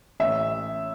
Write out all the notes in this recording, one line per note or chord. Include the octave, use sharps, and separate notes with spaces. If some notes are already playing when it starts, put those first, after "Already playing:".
A1 E5